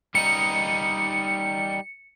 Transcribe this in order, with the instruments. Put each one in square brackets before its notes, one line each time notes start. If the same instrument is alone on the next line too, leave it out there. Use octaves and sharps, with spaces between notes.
[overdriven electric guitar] G3 D#4 [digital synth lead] C#7